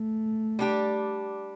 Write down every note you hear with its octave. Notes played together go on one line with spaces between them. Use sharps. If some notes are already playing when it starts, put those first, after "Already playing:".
Already playing: A3
G3 D4 G4